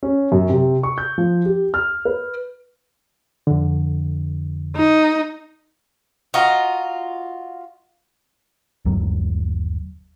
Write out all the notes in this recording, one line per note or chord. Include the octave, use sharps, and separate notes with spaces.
C#4
F#2
C3
C#6
G6
F3
G4
F6
B4
F2 D3
D#4
F4 F#4 D#5 A#5
G1 D#2 F#3